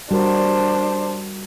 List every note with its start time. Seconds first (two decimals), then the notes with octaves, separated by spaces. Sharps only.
0.11 G3 D4 F#4 A#4 C5